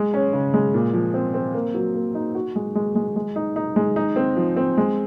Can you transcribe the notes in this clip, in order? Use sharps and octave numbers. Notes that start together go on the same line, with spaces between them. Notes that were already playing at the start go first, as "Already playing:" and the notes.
Already playing: G#3
C#4
C#3
G#3
A#2
F3
C4
C4
A#3
F#3
A#3
D#4
F#4
G#3
G#3
G#3
G#3
D#4
D#4
G#3
D#4
C4
F3
C4
G#3